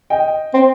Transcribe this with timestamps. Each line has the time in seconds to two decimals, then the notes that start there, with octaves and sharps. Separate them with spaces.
0.10 D#5 G5
0.54 C4